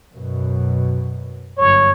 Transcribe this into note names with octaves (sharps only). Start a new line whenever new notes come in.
F#2 B2
G1 F#2 C#5